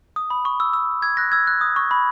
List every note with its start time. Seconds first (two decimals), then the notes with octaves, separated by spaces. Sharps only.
0.16 D#6
0.30 B5
0.45 C#6
0.60 E6
0.73 E6
1.02 E6 G#6
1.17 F#6 A#6
1.32 E6 G#6
1.47 F#6
1.61 D#6
1.76 C#6
1.91 B5